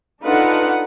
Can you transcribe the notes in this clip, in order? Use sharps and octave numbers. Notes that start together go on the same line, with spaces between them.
D4 D#4 F4 A4 B4 F#5